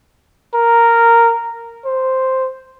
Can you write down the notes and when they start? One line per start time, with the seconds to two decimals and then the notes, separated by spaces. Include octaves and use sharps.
0.55 A#4
1.85 C5